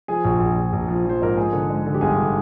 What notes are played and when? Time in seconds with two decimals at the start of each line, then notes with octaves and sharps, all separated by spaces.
0.08 F3 G#4
0.25 A#1
0.40 A#1
0.57 A#1
0.73 A#1
0.88 F3
1.05 F3 C5
1.21 G#2 A#4
1.37 G#3 G#4
1.53 D3
1.70 G#3
1.86 D3
1.94 G4
2.01 G1 G#4
2.18 D3